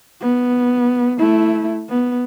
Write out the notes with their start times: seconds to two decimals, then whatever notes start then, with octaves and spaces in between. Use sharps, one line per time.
0.21 B3
1.18 A3 E4
1.89 B3